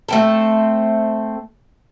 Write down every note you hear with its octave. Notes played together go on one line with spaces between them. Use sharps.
A3 C4 A4